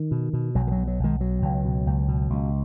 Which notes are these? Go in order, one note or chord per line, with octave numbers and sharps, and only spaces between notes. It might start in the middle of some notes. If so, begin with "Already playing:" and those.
Already playing: D#3
B2
B2
B1 F#3
D#3
F#3
B2
F#3
B1 D#3 G#3
B2 F#3
C#2
B2
C#2
B2
C#2